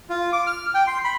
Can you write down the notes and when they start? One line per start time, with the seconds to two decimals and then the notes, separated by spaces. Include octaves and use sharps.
0.10 F4
0.33 D6
0.47 F6
0.74 G5
0.87 C6
1.04 B5